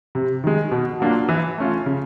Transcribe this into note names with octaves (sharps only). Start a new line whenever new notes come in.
C3
D#3 G#3
B2
F#3 A#3 D4 F4
E3
A3 C#4 F4
C#3